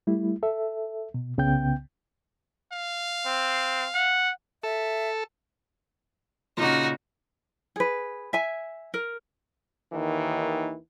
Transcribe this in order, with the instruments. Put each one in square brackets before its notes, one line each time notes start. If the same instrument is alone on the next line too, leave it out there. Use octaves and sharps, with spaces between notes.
[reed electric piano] G3 A3 E4
A4 E5
B2
C2 C#3 B3 G5 G6
[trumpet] F5
[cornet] C4
F#5
[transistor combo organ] A4 [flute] E5
[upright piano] A#2 C#3 [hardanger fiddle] D#4 F#4
[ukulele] G#4 B4
E5 G#5
A#4
[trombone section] D#2 D#3 E3